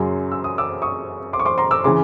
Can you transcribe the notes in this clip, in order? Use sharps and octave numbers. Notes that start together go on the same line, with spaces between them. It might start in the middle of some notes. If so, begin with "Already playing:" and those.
Already playing: F#2 C#3 F#3 C6
E6
D#6
D6 E6
C#6 D#6
C6 D6
C#6
C6 D6
A#5 C6
D6 E6
C#3 E3 C6 D6